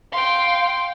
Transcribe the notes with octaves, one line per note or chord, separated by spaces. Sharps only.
F5 G5 C6